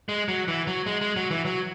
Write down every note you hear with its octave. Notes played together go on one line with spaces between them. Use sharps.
G#3
F#3
E3
F#3
G#3
G#3
F#3
E3
F#3